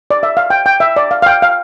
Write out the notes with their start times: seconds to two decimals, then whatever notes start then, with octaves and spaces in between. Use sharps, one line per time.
0.11 D5
0.23 E5
0.37 F5
0.50 G5
0.66 G5
0.80 E5
0.96 D5
1.11 F5
1.22 F5
1.26 G5
1.42 F5